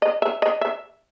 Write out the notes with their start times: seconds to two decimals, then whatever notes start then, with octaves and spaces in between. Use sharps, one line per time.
0.02 D#5
0.22 E5
0.42 D#5
0.61 E5